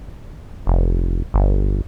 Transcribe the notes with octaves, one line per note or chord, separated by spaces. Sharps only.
F1
G1